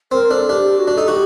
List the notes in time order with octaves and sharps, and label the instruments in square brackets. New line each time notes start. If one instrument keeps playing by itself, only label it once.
[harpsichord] C4 [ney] A#4
[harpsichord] D4 [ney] A4
[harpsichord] D4 [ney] G4
[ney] F#4
[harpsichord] D4
[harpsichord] D#4 [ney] A4
[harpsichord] F#4 [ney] G4